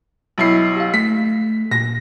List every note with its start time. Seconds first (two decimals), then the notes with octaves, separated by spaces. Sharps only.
0.38 B1 E4 C7
0.76 G4 F5
0.94 A3 B6
1.71 A#2 A#6